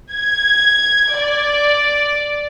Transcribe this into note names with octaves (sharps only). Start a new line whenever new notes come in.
G#6
D5